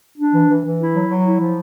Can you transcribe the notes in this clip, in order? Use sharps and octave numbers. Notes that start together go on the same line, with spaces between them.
D4
E3
E3
E3
E4
F#3
F#3
E4
F3